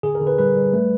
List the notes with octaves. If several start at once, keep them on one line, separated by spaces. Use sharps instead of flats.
D3 G#4
A#4
D3
B4
G3 B4
G3
A3